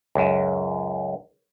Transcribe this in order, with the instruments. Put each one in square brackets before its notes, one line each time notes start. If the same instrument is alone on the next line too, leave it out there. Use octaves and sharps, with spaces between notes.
[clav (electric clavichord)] C#2 F#2